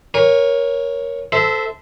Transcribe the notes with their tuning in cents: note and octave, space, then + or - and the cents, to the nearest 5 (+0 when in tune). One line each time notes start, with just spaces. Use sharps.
A#4 +15 C#5 +0 G#5 -30
A4 +0 C5 -20 E5 -15